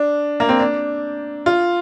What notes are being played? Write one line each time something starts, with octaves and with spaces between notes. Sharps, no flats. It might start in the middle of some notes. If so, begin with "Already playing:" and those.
Already playing: D4
A#3
C4
D4
F4